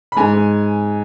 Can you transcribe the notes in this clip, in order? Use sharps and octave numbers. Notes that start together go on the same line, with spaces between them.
B5
G#2 G#5
G#2